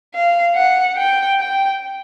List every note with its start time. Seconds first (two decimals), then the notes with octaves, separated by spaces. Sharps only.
0.14 F5
0.56 F#5
0.97 G5
1.40 G5